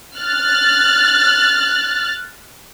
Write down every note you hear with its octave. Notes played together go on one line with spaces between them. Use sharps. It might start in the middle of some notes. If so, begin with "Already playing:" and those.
F6 F#6 A6